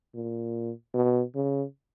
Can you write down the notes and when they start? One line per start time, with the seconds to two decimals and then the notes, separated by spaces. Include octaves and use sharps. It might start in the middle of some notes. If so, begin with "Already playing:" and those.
0.14 A#2
0.94 B2
1.35 C#3